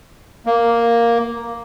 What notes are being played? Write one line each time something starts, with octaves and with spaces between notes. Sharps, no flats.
A#3